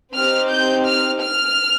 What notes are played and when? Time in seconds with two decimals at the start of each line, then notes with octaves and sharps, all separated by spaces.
0.15 C4 D#4 G4 F6
0.52 G6
0.87 F6
1.23 F6